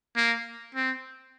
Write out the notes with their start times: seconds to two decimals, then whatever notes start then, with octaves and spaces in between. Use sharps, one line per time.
0.16 A#3
0.75 C4